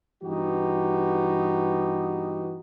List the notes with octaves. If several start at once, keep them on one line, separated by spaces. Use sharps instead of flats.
G2 E3 B3 D#4 F#4 G4